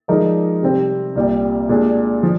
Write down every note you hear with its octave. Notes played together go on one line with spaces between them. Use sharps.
F3 G#3 D#4 A#4 D5
C3 G3 C4
C2 A#2 G3
A#2 G#3 D4
F3